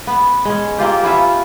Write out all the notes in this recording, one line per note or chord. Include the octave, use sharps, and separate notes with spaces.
B3
G#3 C#4
A#3 C4 F4 G4
B3 C#4 F4 E5